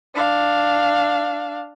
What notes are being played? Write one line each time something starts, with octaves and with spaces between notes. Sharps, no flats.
D4 F5